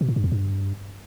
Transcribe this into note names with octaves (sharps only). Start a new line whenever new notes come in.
B2
A2
G2
E2
G2